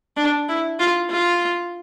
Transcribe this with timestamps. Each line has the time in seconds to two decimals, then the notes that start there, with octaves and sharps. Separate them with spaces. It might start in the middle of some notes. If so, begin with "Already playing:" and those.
0.17 D4
0.49 E4
0.79 F4
1.10 F4